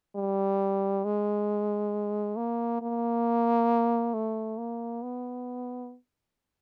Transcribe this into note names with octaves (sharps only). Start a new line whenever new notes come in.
G3
G#3
A#3
A#3
A3
A#3
B3